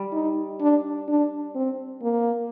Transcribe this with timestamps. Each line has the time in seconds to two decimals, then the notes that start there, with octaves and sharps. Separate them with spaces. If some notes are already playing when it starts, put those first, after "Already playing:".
Already playing: G3
0.13 D#4
0.60 D4
1.08 D4
1.55 C4
2.02 A#3